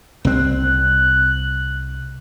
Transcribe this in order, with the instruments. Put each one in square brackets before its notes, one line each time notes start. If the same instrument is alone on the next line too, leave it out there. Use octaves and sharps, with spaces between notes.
[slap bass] C2 C4 [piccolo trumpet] F#6